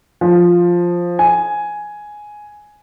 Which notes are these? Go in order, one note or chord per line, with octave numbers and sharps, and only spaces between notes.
F3
G#5